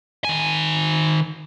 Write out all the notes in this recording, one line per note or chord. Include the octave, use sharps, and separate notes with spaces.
D#3 G#5